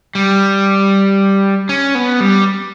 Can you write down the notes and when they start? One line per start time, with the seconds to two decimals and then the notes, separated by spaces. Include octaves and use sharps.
0.15 G3
1.69 C#4
1.95 B3
2.20 G3